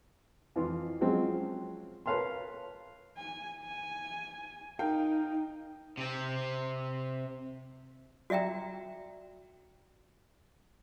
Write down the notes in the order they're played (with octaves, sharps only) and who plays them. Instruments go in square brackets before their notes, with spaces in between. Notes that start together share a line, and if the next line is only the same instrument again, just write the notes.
[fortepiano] F2 E3 F4
F3 F#3 G#3 C4 C#4
A#4 B4 C#5 F5 A5 C6
[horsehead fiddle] G#5
G#5
[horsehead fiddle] D#4 [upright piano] A#4 F5 G5
[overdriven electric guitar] C3 C4
[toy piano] F#4 D5 E5 G5 A#5